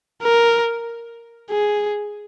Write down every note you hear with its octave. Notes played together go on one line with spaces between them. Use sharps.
A#4
G#4